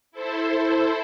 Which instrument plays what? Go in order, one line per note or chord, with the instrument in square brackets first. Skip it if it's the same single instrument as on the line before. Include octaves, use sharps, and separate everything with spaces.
[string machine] E4 A4 C5